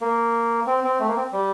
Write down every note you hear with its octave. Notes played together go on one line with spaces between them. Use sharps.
A#3
C4
C4
A3
A#3
C4
G3